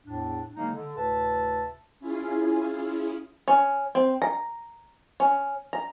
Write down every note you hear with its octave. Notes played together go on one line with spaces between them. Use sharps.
E2 A2 D4
C#3 F#3 G#3 A#3 D#4
D3
D2 A2 C3 B4 E5 A5
C#4 E4 F4 G#4
C#4
C4
A#5
C#4
A#5